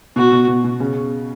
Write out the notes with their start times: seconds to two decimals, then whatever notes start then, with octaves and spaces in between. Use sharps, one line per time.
0.16 B2 F#4
0.32 B2
0.48 B2
0.64 B2
0.80 C#3